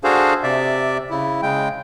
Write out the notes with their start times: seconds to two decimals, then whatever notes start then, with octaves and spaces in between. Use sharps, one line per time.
0.04 D4 F#4 G#4 A4 C5 F5
0.43 C3 D5 E5
1.10 C#3 E4
1.42 C#3 G#3 G5